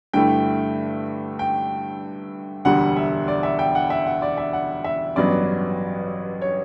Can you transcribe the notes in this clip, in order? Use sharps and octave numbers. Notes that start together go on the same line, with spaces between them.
G2 D3 A3 E4 G5
G5
E1 D2 D3 G3 F#5
E5
D5
E5
G5
F#5
E5
F#5
D5
E5
F#5
E5
A1 G2 F#3 B3 D5
C#5